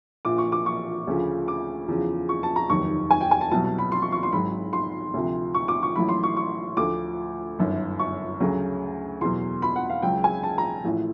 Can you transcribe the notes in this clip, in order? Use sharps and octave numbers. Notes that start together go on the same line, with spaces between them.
A#1 A#2 F3 D6
C#6
D6
C#6
D2 C#3 F3
D6
E2 C#3 F3
C#6
A5
A#5
F1 D#2 D#3 F#3 C#6
G#5
G5
G#5
A5
C2 B2 F#3 A5
A5
B5
C6
C#6
C#6
C6
G#1 G#2 D#3 F#3 B5
C6
D2 C3 F3
C#6
D6
C#6
A1 A2 F#3 B5
C6
C#6
C#6
D2 D3 F3 D6
G1 F#2 D#3
C#6
D2 C#3 F#3
E2 B2 F#3 C6
B5
F#5
F5
C#2 C#3 F#3 G5
G#5
A5
A#5
A1 A2 F3